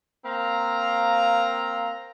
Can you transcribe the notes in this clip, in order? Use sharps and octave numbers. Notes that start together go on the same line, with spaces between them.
A#3 C4 F5 A#5